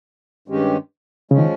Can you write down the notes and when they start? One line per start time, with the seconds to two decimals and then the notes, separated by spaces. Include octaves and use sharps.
0.48 G2 D#3 G#3 C#4 G4
1.31 C#3 F3 G#3 C#4
1.38 D#3